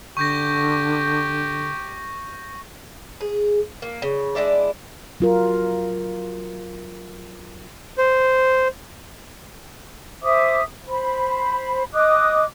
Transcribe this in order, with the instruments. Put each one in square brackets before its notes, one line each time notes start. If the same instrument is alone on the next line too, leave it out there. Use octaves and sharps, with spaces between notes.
[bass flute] D3 [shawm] G4 [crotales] C#6 G6 A#6
[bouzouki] G#4
A#3
C#3
G#3 D4 E4 D5
[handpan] F#3 F4 A#4
[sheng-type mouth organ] C5
[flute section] C5 E5 D6 D#6
C5 B5
D#5 D6 D#6 F#6